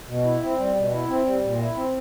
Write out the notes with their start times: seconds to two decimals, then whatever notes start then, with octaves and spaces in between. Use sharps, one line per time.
0.07 B2
0.25 E4
0.42 C4
0.58 G3
0.76 B2
0.92 E4
1.09 C4
1.25 G3
1.43 A#2
1.59 E4
1.76 C4